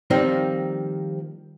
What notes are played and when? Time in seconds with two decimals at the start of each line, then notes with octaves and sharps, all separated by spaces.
0.10 D#3 F3 G3 A#3 C4 D#4